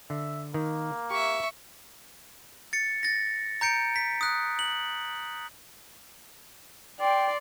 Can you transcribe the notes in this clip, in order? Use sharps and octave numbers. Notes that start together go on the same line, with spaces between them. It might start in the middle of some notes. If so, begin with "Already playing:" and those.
D3 E5
D#3 A#3
G4 E5 C#6
A6 C#7
A6 A#6
A#5 G6 C#7 D7
B6
D#6 F#6
F#7
D5 G5 C6